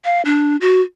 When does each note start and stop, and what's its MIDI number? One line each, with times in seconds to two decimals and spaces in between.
0.05 0.22 77
0.25 0.57 62
0.61 0.81 66